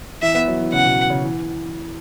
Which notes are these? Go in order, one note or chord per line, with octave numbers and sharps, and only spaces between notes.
E3 E5
B3
F#3
E3
C#3 F#5
B2
C#3
E3